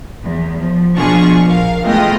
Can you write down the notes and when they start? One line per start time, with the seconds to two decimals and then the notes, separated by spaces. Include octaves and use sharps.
0.24 E2
0.59 F3
0.96 B2 F3 D4 F4 G#4 C#6
1.48 A#1 A#4 F5
1.83 G#3 A3 B3 F4 D#5 G5